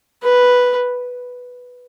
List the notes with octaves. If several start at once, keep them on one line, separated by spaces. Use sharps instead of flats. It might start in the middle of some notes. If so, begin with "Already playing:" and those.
B4